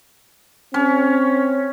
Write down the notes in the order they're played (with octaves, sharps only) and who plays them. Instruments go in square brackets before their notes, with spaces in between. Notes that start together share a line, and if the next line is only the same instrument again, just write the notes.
[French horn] C4 [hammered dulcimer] C#4